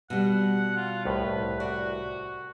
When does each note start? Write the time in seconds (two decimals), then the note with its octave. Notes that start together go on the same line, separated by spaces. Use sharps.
0.10 B2 G3 F#5
0.76 F4
1.05 C2 A2 B4
1.60 F#4 D5